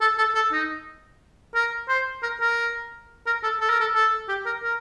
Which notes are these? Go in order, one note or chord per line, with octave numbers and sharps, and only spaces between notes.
A4
A4
A4
D#4
A#4
C5
A#4
A#4
A#4
A4
A4
A#4
A4
A4
G4
A#4
A#4